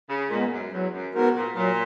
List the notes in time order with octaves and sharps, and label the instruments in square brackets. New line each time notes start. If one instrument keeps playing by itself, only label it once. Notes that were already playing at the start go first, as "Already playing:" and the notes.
[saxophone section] C#3
[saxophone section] A#2 [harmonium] G#3 B3
[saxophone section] F#2
[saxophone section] E2 [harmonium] F#3
[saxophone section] F#2
[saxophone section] G#2 [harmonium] B3 F#4 A#4
[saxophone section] A#2
[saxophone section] A#2 [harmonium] F#3